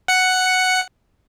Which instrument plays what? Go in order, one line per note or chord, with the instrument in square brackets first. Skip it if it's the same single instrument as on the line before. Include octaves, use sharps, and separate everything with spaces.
[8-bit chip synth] F#5 C#7